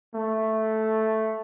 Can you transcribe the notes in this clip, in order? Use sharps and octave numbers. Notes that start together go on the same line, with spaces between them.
A3